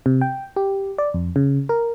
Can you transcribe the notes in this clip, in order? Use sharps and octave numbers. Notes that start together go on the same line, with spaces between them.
C3
G5
G4
D5
F2
C#3
A#4